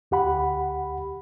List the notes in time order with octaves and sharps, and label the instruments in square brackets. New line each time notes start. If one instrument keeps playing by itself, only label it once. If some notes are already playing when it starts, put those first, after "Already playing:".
[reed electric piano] D2 G4 F#5 B5